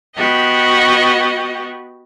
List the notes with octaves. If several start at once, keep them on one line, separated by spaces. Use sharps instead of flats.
B3 F#4 G4 D#5